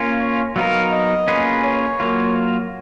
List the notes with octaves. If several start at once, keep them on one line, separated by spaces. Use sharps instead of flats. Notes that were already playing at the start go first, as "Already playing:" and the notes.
Already playing: A#3 C#4 F4
C#5
F#3 B3 D#4 A#4 F5
D#5
A#3 C#4 F4 G#4 B4
C#5
F#3 A#3 F4